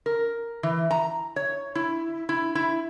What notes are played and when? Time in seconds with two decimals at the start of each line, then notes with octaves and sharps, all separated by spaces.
0.06 A#4
0.63 E3
0.91 A#5
1.36 C#5
1.75 E4
2.29 E4
2.55 E4